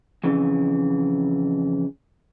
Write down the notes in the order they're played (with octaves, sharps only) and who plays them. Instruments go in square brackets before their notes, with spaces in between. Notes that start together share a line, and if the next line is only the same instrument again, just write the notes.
[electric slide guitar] F2 C#3 E3